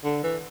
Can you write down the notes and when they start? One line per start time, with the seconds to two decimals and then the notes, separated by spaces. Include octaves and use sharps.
0.04 D3
0.23 E3